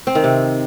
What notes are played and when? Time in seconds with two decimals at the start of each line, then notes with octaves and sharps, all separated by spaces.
0.07 C4
0.15 D#3
0.24 C3